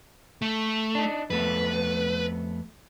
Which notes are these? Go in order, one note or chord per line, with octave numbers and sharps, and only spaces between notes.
A3
D4 D#4
F2 A3 B3 B4